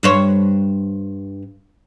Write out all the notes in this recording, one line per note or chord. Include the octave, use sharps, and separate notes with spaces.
G2 C5 C#5